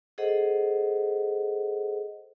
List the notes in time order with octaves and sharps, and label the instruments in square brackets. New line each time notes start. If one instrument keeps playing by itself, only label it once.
[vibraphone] G#4 A4 C5 D#5 F#5